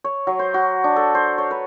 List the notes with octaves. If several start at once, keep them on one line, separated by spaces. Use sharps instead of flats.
C#5
F#3
C5
F#4
D4
A4
C5
C#5
B4